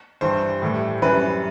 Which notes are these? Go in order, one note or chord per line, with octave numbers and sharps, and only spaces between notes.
G2 E3 G3 C5
A2 E3 G3
F#2 E3 G3 B4